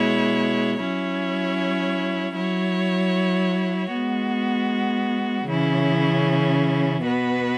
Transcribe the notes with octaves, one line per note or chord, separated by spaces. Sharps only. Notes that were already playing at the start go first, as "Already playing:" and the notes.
Already playing: B2 G#3 E4 C#5
F#3 C#4 E4 C#5
F#3 E4 C#5
G#3 B3 F#4
C#3 E3 C#4 E4
B2 B3 F#4 B4